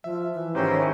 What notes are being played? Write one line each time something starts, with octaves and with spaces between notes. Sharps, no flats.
F3 E5
E3
G#2 D#3 C#4 E4 G4 C5 A#5